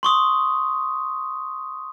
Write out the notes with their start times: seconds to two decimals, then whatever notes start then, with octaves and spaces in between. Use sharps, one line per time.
0.03 C6 C#6 D#6